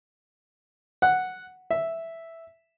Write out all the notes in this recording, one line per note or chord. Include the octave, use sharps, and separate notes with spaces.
F#5
E5